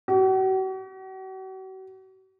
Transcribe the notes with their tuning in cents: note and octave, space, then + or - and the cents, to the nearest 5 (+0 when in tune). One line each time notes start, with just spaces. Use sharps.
F#4 +40